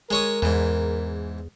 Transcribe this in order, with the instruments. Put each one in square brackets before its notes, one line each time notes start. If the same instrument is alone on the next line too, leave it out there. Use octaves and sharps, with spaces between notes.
[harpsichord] G#3 C#5 D#6 [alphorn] A#4
[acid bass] E2 [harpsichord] G#2 E3